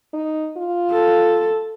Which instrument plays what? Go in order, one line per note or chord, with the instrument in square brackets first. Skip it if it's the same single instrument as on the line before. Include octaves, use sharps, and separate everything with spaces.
[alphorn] D#4
F4
[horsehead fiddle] A4